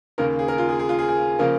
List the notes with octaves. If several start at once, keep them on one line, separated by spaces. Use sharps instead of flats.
D#2 C#3 A#3 A#4
G#4
A#4
F4
G#4
G#4
F4
G#4
G#4
C#3 F3 A#3 A#4